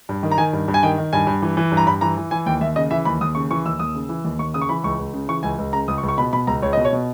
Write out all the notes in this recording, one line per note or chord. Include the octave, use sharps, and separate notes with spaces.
G2
D#3
A#5
D#3 G#5
G2
G2
G#5
D#3 G5
D#3
G2 G#5
G2
E3
E3
G2
A#5
G2 B5
E3 A#5
E3
E3 G#5
D#2 G5
D#2 E5
C#3 D#5
E3 E5
D#2 B5
D#2 D#6
C#3 C#6
E3 C#6
D#2 E6
D#2 D#6
C#3
E3
D#2
D#2 C#6
C#3 D#6
C#6
E3 B5
C#2 C#6
C#2
C#3
E3 C#6
C#2 G#5
C#2
C#3 A#5
C#2 D#6
C#6
C#2
C#6
B2 B5
B2 B5
C#2 A#5
C#2 C#5
B2 D#5
C#5
B2